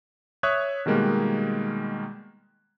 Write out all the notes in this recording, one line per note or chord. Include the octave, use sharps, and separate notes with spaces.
C#5 E5 C#6 D#6 F#6 G#6
B2 D#3 G3 G#3 A#3